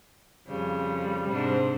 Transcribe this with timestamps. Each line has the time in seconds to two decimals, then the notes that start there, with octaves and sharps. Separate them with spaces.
0.47 F2 C#3 G3
1.29 G#2 C3 D4